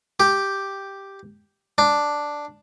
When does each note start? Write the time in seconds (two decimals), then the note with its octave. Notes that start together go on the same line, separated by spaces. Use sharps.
0.20 G4
1.78 D4